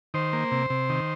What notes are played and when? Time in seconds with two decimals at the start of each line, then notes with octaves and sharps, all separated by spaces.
0.14 D#3 C5
0.33 A#3
0.52 C3
0.70 C3
0.90 D#3